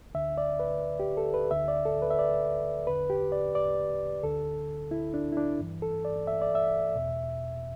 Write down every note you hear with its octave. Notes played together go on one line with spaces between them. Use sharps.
D2 D3 E5
D5
B4
G4
A4
B4
D2 D3 E5
D5
A4
B4
E5
D5
E2 D3 B4
G4
D5
D5
D2 D3 A4
E4
D4
E4
D4
G2 E3
A4
D5
E5
D5
E5
E2 B2